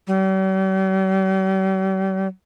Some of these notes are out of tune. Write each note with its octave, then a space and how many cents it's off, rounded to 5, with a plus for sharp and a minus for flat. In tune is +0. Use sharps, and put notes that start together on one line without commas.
G3 -45